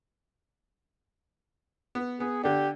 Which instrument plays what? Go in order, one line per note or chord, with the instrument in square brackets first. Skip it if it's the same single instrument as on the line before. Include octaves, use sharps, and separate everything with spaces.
[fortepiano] B3
[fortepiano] B3 [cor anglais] G#4
[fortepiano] D3 D4 [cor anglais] G4